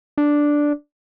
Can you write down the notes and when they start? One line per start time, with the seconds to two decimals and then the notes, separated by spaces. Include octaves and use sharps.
0.18 D4